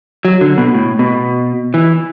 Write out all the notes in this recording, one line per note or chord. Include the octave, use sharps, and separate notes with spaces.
F#3
D3
B2
A2
B2
E3